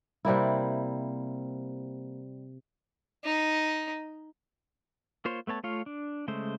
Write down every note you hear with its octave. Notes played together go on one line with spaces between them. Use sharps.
C3 G3 A#3 E4
D#4
A#3 F4 C5 C#5
A3 B3 C#5 A5
A3 F4 C#5 F5
D4
C#3 G#3 A3 C5